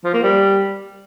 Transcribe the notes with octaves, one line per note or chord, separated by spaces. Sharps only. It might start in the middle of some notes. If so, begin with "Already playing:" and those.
F3
A#3
G3